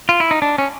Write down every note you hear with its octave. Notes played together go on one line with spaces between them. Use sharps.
F4
E4
D#4
D4
C#4